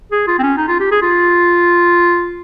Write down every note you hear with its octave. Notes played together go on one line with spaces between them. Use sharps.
G#4
F4
C4
C#4
D#4
F4
G4
G#4
F4